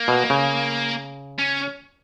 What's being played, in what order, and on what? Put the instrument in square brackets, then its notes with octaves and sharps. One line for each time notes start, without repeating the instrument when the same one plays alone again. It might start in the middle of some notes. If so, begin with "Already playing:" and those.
Already playing: [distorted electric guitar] A#3
[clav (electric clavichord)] B2
C#3
[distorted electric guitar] C#4